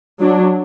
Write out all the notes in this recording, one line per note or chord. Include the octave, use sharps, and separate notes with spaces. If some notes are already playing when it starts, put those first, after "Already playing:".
F#3 D4